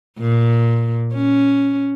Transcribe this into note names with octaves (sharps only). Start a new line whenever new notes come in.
A#2
C#4